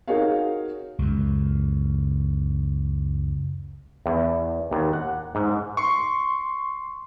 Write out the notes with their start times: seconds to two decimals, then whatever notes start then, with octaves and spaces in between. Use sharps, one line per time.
0.08 D#4 F#4 G#4 A#4 C#5 F5
0.99 C#2 F#2
4.06 E2
4.71 D#2
4.93 F#5
5.35 G#2
5.77 C6 C#6